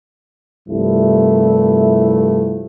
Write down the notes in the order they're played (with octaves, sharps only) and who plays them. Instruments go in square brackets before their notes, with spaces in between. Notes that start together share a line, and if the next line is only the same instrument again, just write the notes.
[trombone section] C2 G2 F3 A3 E4